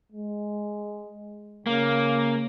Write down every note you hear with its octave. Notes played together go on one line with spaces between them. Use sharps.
G#3
C#3 A#3